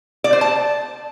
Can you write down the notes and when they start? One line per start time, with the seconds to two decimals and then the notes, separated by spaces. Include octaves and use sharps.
0.24 D5
0.33 C5
0.41 A5